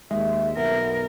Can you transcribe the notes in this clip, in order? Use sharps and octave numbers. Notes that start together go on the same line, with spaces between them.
D#2 G#3 E5
B1 B3 A#4